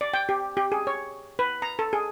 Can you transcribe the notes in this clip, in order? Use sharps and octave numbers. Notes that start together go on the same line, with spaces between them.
D5
G5
G4
G4
G#4
C#5
B4
A#5
A4
G#4